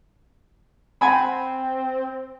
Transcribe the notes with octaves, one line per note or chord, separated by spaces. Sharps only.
C4 F#5 G#5 B5